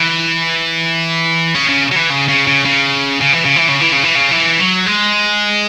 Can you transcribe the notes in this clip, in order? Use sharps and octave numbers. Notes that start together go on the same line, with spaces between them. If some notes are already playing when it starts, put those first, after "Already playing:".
Already playing: E3
C#3
C#3
F#3
E3
C#3
C#3
C#3
C#3
C#3
E3
C#3
E3
C#3
E3
C#3
E3
C#3
E3
F#3
G#3